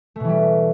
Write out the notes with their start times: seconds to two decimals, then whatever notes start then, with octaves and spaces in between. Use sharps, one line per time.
0.16 A3
0.20 B2
0.24 E3
0.29 G3